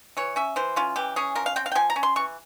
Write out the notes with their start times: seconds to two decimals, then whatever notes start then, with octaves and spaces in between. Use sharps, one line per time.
0.17 E3 C#5
0.36 C#4 E5
0.56 E3 C5
0.76 C#4 F4
0.96 E3 G4
1.16 C#4 G#4
1.35 F3 A#4
1.46 F5
1.56 C4 G5
1.66 F5
1.72 G5
1.75 F3 G#5
1.90 A#5
1.96 C#4
2.03 C6
2.16 E3 C#6